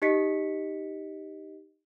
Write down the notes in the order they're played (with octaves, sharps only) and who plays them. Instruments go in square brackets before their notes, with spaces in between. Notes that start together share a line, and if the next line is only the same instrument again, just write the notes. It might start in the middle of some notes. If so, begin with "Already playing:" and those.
[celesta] D#4 G4 D#5 B6 C#7